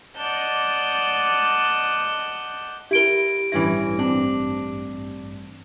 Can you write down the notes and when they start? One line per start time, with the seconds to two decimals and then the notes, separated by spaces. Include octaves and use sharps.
0.16 D5 D#5 F#5 A5 G6
2.91 E4 G4 A#4 D7 G7
3.52 A1 G2 E3 C#4 E4 A#6
3.99 C4 D4